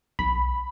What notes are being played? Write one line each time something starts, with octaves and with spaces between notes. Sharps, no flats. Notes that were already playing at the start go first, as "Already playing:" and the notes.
B1 B5